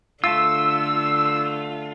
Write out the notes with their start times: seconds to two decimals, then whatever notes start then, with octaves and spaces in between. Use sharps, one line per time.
0.24 D3 A3 F4 E6